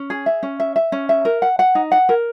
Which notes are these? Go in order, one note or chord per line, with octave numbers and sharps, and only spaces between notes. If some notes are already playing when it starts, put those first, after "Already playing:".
Already playing: C#4
G#4
E5
C#4
E5
E5
C#4
E5
A#4
F#5
F#5
D#4
F#5
A#4